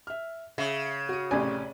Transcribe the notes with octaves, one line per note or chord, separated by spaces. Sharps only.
E5 F6
C#3 E5
F#4 D#7
A1 C3 D5 G#5